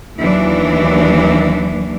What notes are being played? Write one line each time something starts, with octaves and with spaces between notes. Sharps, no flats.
D#2 E3 F#3 D4